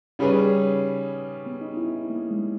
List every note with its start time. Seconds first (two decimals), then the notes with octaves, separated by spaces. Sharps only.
0.19 C#3 G3 C#4 D#4 G#4 B4
1.46 B3
1.61 D#4
1.77 E4
1.93 D#4
2.10 A#3
2.31 G#3